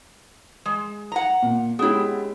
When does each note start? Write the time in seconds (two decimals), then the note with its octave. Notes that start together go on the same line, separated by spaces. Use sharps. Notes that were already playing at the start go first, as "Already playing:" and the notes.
0.66 G#3
1.12 F#5 A#5
1.42 A#2
1.79 G#3 B3 C#4 E4 G4